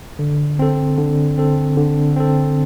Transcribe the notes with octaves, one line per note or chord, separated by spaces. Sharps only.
D3
C4 A4
D3
C4 A4
D3
C4 A4